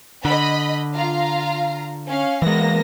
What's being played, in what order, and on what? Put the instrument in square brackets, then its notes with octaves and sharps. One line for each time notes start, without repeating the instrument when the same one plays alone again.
[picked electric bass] D3 [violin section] D#5 B5
[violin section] F4 F5 A#5
C#4 F5
[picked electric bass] E3 G#3 [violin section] A#3 B3 A#6